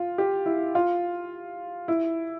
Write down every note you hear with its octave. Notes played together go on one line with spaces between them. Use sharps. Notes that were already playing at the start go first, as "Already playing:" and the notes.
Already playing: F4
G4
E4
F4
E4